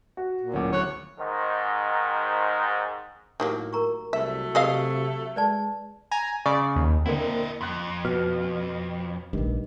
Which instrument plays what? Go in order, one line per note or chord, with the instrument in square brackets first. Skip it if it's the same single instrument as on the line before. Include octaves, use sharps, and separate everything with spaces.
[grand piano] F#4
[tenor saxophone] A#2
[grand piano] D1 F#5 D6 [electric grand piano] A2 C#4
[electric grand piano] D2 F#6 [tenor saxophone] C#5
[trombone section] G#2 D#3
[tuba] A2 [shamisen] D#3 F#3 A#3 [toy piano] G4 D6
[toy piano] A#4 A#5 C#6
[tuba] C2 [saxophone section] F#3 A3 [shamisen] E5
[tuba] C3 [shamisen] G#4 D#5 F5 [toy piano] E6
[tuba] G#3 [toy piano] B4 D5 A5
[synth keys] G#5 A#5
[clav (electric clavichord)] C#3 [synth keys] D5
[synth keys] D#2
[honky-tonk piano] D3 A#3 C4 [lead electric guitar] E4 D#5
[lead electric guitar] F2 [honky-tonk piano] C6 F#6
[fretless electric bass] B2 [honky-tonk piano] F6
[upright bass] A#1 A3 [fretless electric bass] G2 D#3